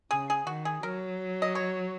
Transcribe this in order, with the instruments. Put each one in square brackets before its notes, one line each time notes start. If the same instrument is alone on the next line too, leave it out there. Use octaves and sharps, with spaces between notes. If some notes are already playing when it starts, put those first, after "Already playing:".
[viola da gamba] C#3 [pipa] G#4
[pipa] G#4
[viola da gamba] D#3 [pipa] F#4
[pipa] G#4
[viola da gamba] F#3 [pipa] A#4
[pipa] D#5
C#5